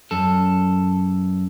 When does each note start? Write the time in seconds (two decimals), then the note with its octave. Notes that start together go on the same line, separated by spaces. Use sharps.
0.11 F#2 A4